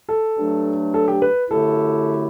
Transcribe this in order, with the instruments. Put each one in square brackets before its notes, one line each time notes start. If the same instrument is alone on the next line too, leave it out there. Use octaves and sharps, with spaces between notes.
[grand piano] A4
[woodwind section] G2 F#3 A3 D4
[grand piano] A4
G4
B4
[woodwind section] F#2 D3 A3 E4 G4 [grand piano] A4